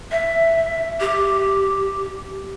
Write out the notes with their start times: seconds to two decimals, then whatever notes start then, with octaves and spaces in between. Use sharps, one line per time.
0.12 E5
1.01 G4